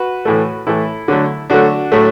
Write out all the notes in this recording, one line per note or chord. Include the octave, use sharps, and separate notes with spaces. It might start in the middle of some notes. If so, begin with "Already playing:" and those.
Already playing: F#4 B4
A2 E3 A3
A2 E3 A3 E4 A4
D3 F#3 A3
D3 F#3 A3 D4 F#4
A2 F#3 A3